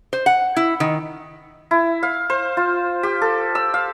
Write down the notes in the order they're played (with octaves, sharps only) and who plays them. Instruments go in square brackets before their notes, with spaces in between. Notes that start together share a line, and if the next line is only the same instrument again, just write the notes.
[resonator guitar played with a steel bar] C5
F#5
E4
D#3
[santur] E4
F5
C5
F4
G4
A4
E6
F5